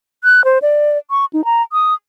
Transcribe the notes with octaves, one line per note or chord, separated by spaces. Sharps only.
F#6
C5
D5
C#6
D#4
A#5
D#6